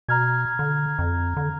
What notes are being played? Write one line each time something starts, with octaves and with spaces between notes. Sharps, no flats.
B2 A#5 F6 G#6
D3
F2
D3